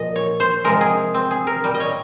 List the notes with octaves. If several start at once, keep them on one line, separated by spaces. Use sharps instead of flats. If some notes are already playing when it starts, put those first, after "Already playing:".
Already playing: A#2 F3 D#5
C#5
C5
C3 F3 G#3 A#4
G#4
C4
G#4
A#4
A#2 G3
D#5
C#5